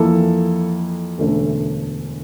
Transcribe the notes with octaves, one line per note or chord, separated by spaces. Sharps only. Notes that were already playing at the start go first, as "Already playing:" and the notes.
Already playing: F2 E3 A#3 E4 A4
E1 D2 D3 A3 C#4